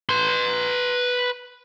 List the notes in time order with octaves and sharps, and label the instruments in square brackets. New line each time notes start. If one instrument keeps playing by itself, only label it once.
[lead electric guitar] B4 C6